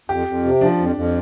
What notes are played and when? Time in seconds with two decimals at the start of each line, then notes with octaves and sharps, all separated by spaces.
0.09 F2 G4
0.27 F2
0.44 C3
0.61 F3 D4
0.79 F2
0.96 F2